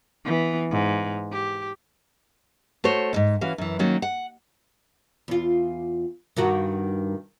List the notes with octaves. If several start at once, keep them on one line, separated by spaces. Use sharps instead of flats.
E3 B3
G#2
G4
A3 F#4 C5 C#5
D#2 G#2
E3 C#4 F#4 F5
F#2 E3
D#3 F#3 A#3 C#4
F#5
E2 F4
G2 D#3 F#4